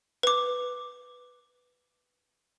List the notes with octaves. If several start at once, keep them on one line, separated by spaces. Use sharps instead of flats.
B4 D6